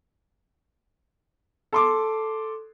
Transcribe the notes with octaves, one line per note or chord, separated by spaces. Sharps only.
A4 C6 D6